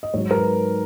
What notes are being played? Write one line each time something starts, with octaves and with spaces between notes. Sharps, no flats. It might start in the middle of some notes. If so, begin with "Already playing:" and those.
D#5
G#2 F#3 C#5
A#4
B4